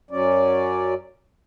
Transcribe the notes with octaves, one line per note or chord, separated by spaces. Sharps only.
F#2 F#3 C#4 D5